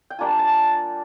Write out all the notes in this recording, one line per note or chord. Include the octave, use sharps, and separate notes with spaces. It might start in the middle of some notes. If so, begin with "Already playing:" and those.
G5
G3 A#3 D4 F4 G#5
A5